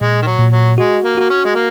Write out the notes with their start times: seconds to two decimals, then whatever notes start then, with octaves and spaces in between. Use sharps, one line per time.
0.01 A#2 G#3
0.22 D#3
0.27 F#3
0.39 A#2
0.53 F#3
0.78 G#3 F#4
1.04 A#3
1.17 A#3 F#4
1.30 C#4
1.45 G#3
1.55 A#3